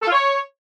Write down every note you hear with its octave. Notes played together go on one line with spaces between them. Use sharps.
A4
F4
C#5